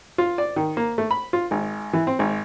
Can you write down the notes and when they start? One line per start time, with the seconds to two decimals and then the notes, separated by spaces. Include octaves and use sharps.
0.18 F4
0.38 D5
0.56 D#3
0.77 A#3
0.98 A3
1.11 B5
1.33 F4
1.51 G#1
1.93 E3
2.07 C4
2.19 G#1